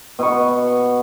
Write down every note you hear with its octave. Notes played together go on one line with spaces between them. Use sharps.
B2 C#6